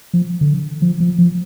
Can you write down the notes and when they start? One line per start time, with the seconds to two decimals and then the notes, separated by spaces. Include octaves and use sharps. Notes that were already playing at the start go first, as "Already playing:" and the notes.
0.14 F3
0.41 D3
0.82 F3
1.00 F3
1.18 F3